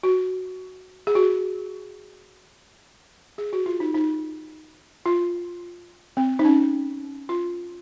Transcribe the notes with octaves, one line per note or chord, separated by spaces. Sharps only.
F#4
G#4
F#4
G#4
F#4
F4
D#4
D#4
F4
C4
D#4
C#4
F4